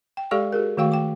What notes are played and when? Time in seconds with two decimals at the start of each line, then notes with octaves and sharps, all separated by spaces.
0.17 G5
0.31 G#3 G4 A4 D5 F5 C#6
0.53 F#4 G#4 A#4
0.77 D#3 A3 F#4 F5 G5 C#6
0.92 G5 D6